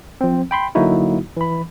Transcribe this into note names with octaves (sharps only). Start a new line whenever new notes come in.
F3 C4
G5 B5 C6
D3 F#3 A#3 D#4 E4 F#4
E3 B5